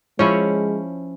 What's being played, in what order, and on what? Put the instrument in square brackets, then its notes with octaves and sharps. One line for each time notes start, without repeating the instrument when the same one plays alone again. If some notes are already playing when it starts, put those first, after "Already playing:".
[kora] F3 C#4 E4 [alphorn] G#3 [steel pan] C#5